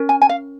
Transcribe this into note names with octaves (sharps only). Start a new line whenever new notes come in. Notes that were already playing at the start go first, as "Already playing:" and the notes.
Already playing: C#4 A#4
G#5
G#5
F5